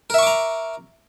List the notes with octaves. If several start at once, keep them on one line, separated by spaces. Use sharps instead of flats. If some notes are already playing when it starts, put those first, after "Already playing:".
A#4 E5 A#5 C#6 D6